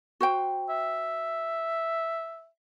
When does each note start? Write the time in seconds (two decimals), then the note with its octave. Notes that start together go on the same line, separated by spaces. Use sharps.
0.21 F#4 C5 G5
0.70 E5